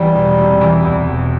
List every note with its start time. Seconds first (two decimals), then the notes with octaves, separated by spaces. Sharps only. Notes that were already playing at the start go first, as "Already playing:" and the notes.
Already playing: E2 E3 G3
0.15 E1
0.38 C3
0.61 E3
0.84 E2
1.08 E1